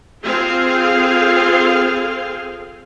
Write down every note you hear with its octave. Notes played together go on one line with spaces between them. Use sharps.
C4 F4 G#4 A4 F5